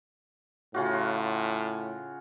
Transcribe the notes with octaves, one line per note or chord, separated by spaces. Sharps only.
A2 C#3 F4 F#4